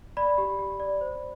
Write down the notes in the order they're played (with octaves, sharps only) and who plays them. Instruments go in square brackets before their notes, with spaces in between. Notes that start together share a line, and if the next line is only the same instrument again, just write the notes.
[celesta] D5 B5
G4
G4
D5
C5